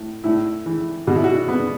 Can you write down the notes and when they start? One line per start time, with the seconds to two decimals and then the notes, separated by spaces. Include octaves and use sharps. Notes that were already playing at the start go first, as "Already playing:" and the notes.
Already playing: A2
0.24 A2 E4
0.66 E3
1.07 B2 F#4
1.16 E4
1.24 F#4
1.48 B3